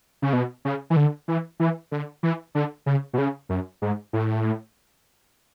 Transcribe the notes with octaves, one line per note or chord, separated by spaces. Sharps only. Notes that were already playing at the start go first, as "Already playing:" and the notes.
C#3
B2
C#3
E3
D3
E3
E3
D3
E3
D3
C#3
B2
C#3
F#2
G#2
A2